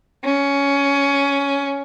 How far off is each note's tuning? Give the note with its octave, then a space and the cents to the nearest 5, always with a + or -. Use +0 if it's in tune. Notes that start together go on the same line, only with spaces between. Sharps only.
C#4 +15